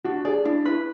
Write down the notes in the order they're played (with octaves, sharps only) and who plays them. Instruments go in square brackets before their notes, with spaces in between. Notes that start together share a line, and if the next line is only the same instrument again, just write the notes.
[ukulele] D4 [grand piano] F#4
[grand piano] G#4 [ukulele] D5
[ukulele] D4 [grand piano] E4
[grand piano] E4 [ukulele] B4